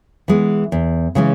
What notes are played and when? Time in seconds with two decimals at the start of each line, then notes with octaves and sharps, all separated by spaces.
0.28 E3 G#3 B3
0.72 E2
1.15 C#3 E3 G#3 C#4